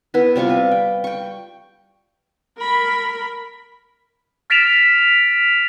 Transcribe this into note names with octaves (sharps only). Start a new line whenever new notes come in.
B3 E4 B4
C3 G3 F4 C#6
B4
G5
G5 C#6
A#4 B5
F6 A6 B6 D7 E7 F7